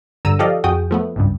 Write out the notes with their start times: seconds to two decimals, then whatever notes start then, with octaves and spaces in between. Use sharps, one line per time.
0.25 G2 D3 A#5 E6 D#7
0.39 F3 G4 A4 D5 D#5 F5
0.64 F2 F#4 G#4 G5 D#6
0.91 F3 A3 B3
1.16 G#1 C#2 G2